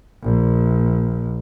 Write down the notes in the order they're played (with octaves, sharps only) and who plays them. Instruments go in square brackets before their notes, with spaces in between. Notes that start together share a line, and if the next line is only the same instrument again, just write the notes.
[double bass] A#1